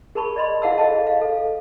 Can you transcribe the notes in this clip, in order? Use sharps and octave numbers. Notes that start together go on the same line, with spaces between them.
G#4 A#4 A5 B5 C#6
D5 D#5 B5 C6
E4 G#4 F5 F#5 A5 E6
G#4 A4 D#5 F5 A5
F5
A4